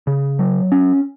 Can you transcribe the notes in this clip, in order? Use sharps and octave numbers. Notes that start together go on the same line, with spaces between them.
C#3
F#3
C#4